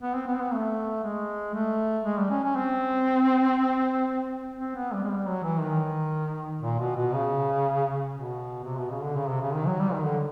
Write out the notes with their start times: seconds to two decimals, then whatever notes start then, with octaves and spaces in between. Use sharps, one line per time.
0.02 B3
0.15 C4
0.27 B3
0.35 C4
0.40 B3
0.53 A3
1.03 G#3
1.54 A3
2.05 G#3
2.18 G3
2.30 C#4
2.43 C#4
2.56 C4
4.59 C4
4.75 B3
4.93 G3
5.04 G#3
5.10 G3
5.27 F#3
5.43 E3
5.61 D#3
6.62 A#2
6.79 B2
6.96 B2
7.13 C#3
8.14 B2
8.64 C3
8.77 B2
8.90 C#3
9.02 D3
9.15 C#3
9.28 C3
9.41 C#3
9.53 D#3
9.66 F#3
9.79 G3
9.92 D#3
10.05 D3